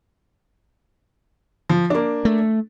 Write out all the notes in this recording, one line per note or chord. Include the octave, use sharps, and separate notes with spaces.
F3
A#3 D4
A3